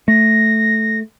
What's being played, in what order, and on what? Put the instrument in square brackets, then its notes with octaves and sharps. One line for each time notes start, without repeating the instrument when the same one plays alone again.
[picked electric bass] A3 [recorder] A#6